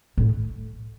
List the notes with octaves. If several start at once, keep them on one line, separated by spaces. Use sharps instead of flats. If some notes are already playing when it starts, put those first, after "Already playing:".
A2